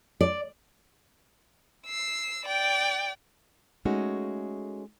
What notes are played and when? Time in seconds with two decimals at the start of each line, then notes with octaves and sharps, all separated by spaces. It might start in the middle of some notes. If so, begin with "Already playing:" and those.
0.21 D5
1.87 E6 C7
2.45 D5 G5
3.85 G#3 A3 C#4 D#4 F#4